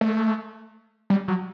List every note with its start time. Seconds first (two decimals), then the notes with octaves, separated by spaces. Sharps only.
0.01 A3
1.10 G3
1.28 F#3